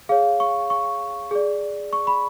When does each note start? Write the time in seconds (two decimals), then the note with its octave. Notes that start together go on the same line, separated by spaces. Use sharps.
0.09 G#4 C#5 F5
0.40 C#6
0.70 C#6
1.31 G#4 D5
1.93 C#6
2.07 B5